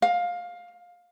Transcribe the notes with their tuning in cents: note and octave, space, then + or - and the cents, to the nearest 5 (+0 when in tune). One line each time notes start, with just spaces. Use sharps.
F5 +15